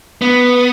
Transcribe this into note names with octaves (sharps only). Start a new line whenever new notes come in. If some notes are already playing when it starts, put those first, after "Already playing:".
B3